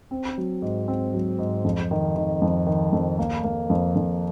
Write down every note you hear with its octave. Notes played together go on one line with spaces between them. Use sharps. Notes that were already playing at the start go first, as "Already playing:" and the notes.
C4
F#3
G#2
C4
F#3
G#2
F2
D#3
D#3
F2
D#3
F2
A#3
A#3
F2
F2